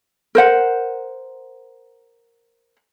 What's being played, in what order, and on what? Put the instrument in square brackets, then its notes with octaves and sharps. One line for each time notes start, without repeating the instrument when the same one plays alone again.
[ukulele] A#4 C5 F#5